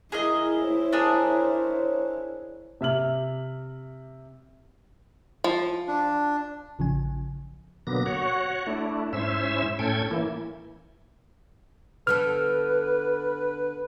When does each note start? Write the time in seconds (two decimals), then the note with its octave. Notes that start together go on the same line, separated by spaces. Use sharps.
0.12 E4 G#4 A#4 D#5
0.61 C5 C#5
0.92 D4 G#4 A#4
2.81 C3 E5 F6 F#7
5.44 F3
5.88 D4
6.79 A1 C#3 F3 G#5
7.87 B2 D3 F#3 A#3 B3 A#6
8.06 F#4 C#5 F#5
8.66 A3 D4 E4
9.13 G#2 C#4 E4 C5 E5 E6
9.79 A2 C#4 A4 G5 G#6
10.11 E3 A#3 E4
12.07 D3 B3 A4 B4 F6